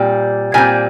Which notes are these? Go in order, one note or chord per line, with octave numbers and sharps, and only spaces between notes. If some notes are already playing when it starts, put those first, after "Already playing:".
Already playing: A#2 G3 C4
A#2 G3 C4 G#5